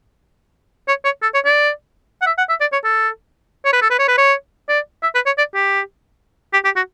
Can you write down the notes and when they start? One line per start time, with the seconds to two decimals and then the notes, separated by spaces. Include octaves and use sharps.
0.88 C#5
1.05 C#5
1.22 A4
1.34 C#5
1.45 D5
2.22 F#5
2.27 E5
2.38 F#5
2.49 E5
2.61 D5
2.73 C#5
2.84 A4
3.65 C#5
3.73 B4
3.82 A4
3.90 B4
3.99 C#5
4.08 B4
4.18 C#5
4.69 D5
5.03 E5
5.15 B4
5.26 C#5
5.38 D5
5.55 G4
6.53 G4
6.65 G4
6.76 F#4